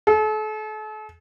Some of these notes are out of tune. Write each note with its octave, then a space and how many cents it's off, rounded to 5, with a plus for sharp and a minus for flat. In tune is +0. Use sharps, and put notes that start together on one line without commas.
A4 -40